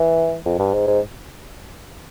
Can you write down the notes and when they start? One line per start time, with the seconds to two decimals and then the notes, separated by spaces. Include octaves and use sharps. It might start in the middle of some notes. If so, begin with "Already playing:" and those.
Already playing: E3
0.46 F2
0.59 G2
0.74 G#2
0.87 G#2